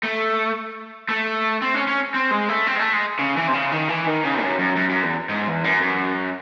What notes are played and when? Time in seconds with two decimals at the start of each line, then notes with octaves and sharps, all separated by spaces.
0.03 A3
1.09 A3
1.62 C4
1.74 C#4
1.87 C#4
2.14 C4
2.31 G#3
2.49 A3
2.67 C4
2.76 G#3
2.79 A3
2.93 G#3
3.19 C#3
3.37 E3
3.48 C3
3.54 C#3
3.72 D#3
3.89 E3
4.07 D#3
4.24 C#3
4.42 F#2
4.59 F#2
4.76 F#2
4.90 F#2
5.04 E2
5.29 G#2
5.48 E2
5.64 F#2
5.82 F#2